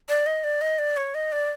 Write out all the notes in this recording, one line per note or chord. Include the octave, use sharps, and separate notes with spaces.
D5
D#5
D5
D#5
D5
C#5
D#5
D5